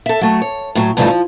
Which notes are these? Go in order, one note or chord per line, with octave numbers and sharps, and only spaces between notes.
A4 E5
F#3 A3
C#5
A2 F#3
G2 C#3 E3 F3 A3 D#4
F3